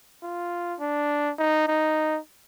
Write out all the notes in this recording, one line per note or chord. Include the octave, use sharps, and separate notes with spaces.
F4
D4
D#4
D#4